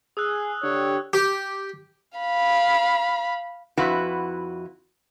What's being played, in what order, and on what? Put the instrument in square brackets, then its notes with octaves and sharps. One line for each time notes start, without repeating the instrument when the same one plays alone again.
[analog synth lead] G#4 [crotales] D#6 E6 F#6
[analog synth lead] D3 [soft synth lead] G4 [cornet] C#5
[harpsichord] G4
[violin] F5 B5
[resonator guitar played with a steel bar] F2 E4 F#4 B4